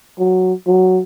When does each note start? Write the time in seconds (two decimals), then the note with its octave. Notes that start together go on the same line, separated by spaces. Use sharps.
0.19 F#3
0.67 F#3